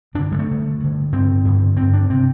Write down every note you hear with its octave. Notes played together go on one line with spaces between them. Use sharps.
G2 D3 D4
G3
A3
G2 D3
G2 D3
G2 D3 C4
G2 D3
D3 C4
G2
D4
C3 C4